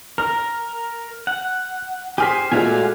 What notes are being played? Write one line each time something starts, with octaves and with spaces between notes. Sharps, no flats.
A#4 F6
F#5
G4 G#4 C5 G#5 F6 B6
A#2 G#3 A3 F#4 F5 G#5